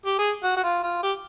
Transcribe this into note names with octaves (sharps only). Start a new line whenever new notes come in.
G4
G#4
F#4
F#4
F4
F4
G4